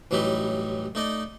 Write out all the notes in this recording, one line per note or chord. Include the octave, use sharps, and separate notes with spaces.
A1 E3 F#3 G3 D#4 B4
A3 D#4 D5 D#5